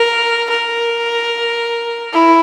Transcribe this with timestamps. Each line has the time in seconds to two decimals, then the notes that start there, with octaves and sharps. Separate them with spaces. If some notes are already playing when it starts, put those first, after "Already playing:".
Already playing: A#4
0.50 A#4
2.12 E4